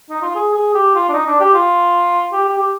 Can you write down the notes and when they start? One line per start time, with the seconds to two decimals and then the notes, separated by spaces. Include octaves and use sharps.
0.10 D#4
0.22 F4
0.35 G#4
0.55 G#4
0.74 G4
0.95 F4
1.09 D4
1.14 D#4
1.26 D4
1.40 G4
1.54 F4
2.32 G4
2.44 G4
2.57 G4